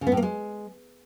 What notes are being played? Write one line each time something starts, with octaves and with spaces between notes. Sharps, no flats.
C#3
B3
A2
A#3
G#3